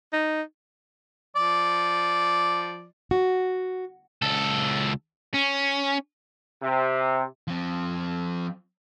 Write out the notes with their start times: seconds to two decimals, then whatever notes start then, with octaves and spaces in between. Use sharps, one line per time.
0.13 D#4
1.36 F3 D5
3.11 F#4
4.22 C#2 A4
5.34 C#4
6.62 C3
7.48 F3 C4